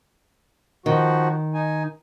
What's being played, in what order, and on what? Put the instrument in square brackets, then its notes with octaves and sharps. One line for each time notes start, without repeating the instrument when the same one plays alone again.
[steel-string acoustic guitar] D#3 [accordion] F3 F#4
[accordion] D#4 G#5